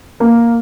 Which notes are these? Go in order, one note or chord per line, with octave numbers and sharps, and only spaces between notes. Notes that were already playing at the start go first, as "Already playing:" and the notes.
A#3